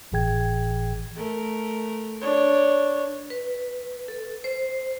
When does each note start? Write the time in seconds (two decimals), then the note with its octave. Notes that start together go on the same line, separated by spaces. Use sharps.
0.12 G1 A2 E3 G#4 G5 G#6
1.16 A3 A#4
2.21 D4 C#5
3.30 B4
4.08 A4
4.44 C5